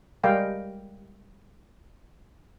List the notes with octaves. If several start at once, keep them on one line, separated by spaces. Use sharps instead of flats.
G3 G#3 A#4 F5 G5